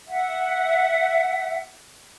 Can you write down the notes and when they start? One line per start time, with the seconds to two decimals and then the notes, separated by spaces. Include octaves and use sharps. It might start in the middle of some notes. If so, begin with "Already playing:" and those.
0.08 E5 F#5